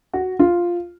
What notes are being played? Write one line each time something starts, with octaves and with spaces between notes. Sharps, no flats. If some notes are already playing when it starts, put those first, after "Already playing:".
F#4
F4